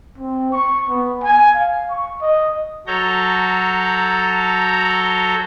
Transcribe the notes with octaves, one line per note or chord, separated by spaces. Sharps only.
C4
C#6
B3
G#5
F5
C#6
D#5
F#3 F#4 A4 C#5 A#5 G6